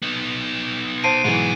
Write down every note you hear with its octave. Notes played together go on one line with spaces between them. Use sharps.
B3 D#4
C5 A5 C7 D7 D#7
G#2 B2 E3 F#3